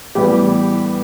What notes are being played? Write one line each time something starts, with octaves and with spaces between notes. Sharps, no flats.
A2 E3 G3 B3 G4